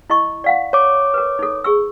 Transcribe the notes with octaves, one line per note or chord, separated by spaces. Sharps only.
E4 D#5 C#6
D5 F5 F#5
C#5 D6
A#4 B4
D#4 A4
G#4 C#6 E6